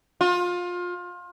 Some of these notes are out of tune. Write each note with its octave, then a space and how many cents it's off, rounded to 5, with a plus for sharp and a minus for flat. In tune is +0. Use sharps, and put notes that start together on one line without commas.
F4 +25